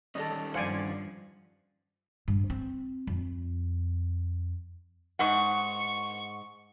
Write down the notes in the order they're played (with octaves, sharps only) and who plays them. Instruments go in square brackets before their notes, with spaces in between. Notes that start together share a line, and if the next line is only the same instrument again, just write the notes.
[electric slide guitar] D#3 G3 C#4 [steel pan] A4 D5 D#5
[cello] G2 F3 [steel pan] C5 F5 G#5 [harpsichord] D5 F#5
[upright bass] G2
C4
F2
[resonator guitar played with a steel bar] G#2 F#5 [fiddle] C#6